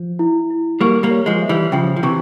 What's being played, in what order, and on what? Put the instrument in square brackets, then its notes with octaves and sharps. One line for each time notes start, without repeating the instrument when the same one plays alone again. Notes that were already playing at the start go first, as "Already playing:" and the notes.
Already playing: [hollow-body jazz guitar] F3
[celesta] E4
E4
[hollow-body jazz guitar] G3 A#3 [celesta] C#6
[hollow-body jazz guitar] G3 A#3
[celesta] C#5
[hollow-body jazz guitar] F3 G#3
[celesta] E5
[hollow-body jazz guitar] E3 G3
[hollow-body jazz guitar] C#3 F3 [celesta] G5
[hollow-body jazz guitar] F3
[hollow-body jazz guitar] C3 E3 [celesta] C#6